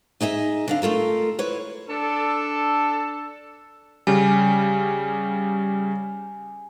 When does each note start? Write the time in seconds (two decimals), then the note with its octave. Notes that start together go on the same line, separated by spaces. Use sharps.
0.21 D#4 G#4 D#5 E5
0.68 D3 D4 F5
0.82 A3 F4 A4 A#4
1.39 E4 B4 C#5
1.89 D4 A4
4.07 C#3 G3 G#5